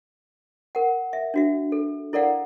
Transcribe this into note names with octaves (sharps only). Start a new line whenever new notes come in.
A#4 F#5
E5
D4 F#4 E5
A4
E4 A4 A#4 D5 F5 F#5